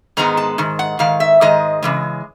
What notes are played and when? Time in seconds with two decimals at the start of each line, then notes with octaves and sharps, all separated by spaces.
0.17 G#2 D#3 G#3 B3 A#5
0.37 A5
0.58 G#2 D#3
0.79 F#5
0.99 G#2 D#3 F5
1.20 E5
1.41 G#2 D#3 G#3 D#5
1.83 C#3 E3 G#3